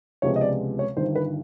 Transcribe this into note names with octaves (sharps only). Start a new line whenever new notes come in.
C#2 C3 F3 G#3 B3 C#5
D#5
D5
C#5
G1 G2 D#3 C5
B4